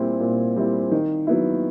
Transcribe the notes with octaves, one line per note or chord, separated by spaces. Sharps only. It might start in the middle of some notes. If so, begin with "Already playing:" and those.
Already playing: A#2 G3 C4 E4
A#2
G3 C4 E4
D#3
F#3 B3 E4